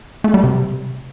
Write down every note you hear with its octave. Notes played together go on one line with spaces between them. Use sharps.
A3
G3
C3